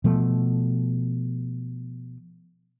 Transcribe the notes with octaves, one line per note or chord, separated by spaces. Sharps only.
B2 F3 A3